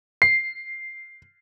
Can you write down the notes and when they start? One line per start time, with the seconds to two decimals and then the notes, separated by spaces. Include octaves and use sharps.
0.22 C7